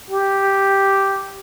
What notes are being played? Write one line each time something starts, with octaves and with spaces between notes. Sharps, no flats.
G4